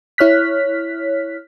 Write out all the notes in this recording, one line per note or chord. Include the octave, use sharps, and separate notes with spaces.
E4 C#5 F6 F#6 B6